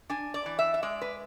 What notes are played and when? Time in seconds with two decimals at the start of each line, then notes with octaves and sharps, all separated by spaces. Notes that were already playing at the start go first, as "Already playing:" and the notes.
0.10 D4 G#5
0.34 D5
0.46 E3
0.59 E5
0.74 E5
0.83 G#3 D5
1.01 B4